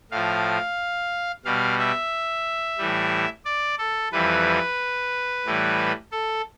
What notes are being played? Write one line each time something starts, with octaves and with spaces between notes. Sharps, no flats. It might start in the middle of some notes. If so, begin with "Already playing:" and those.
A2 F3 F5
B2 G3 F5
E5
A2 E3 G3
D5
A4
F2 E3 G3 B4
A2 E3 G3
A4